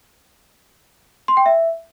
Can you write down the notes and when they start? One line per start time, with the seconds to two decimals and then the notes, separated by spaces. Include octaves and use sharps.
1.28 C6
1.37 G5
1.46 E5